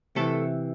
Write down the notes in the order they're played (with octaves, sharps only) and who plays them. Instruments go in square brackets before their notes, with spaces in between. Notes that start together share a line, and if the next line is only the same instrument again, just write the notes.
[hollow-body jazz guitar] C3 E3 A3 A4